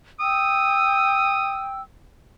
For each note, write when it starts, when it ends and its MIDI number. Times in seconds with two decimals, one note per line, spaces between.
0.20 1.81 79
0.20 1.69 87
0.20 1.81 88